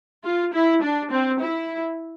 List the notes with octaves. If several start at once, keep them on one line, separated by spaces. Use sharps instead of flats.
F4
E4
D4
C4
E4